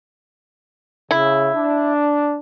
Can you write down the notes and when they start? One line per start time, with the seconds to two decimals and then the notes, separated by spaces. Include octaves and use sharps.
1.11 C#3 E4
1.55 D4